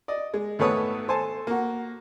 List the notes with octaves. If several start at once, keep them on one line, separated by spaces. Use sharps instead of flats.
D5 D#5
G#3
G#1 A3 B3 B4 C#5 D#6
A4 C5 G#5 A5
A#3 F#4